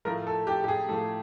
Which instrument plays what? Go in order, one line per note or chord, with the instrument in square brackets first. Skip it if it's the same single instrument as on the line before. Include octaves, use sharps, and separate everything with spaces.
[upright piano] A2 F3 A3 A#4
A4
G4
G4
G#4
A2 F3 A3 A4